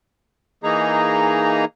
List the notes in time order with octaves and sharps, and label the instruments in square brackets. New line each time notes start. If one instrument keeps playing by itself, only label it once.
[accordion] E3 A#3 D#4 G#4 A#5